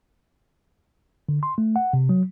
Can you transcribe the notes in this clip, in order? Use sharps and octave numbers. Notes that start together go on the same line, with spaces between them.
D3
C6
A3
F#5
C3
F#3